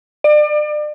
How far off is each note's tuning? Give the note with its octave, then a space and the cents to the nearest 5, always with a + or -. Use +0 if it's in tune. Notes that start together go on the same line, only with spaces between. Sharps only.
D5 +35